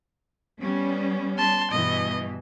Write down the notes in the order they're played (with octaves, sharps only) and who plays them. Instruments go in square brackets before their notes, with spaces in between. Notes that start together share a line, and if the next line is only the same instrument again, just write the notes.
[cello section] G3 B3 C#4
[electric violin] A5 C6
[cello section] G2 B2 E3 [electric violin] D#5